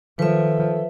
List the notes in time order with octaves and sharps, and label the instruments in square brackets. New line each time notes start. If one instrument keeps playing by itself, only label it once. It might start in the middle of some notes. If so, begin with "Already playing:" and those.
[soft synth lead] D#3 [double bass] F3 [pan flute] A4 [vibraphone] B4 E5